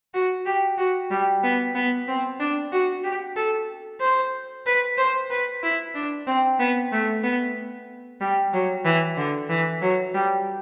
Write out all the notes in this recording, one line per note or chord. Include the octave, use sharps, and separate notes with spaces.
F#4
G4
F#4
G3
B3
B3
C4
D4
F#4
G4
A4
C5
B4
C5
B4
E4
D4
C4
B3
A3
B3
G3
F#3
E3
D3
E3
F#3
G3